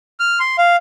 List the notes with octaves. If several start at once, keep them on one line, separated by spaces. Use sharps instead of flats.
F6
C6
F5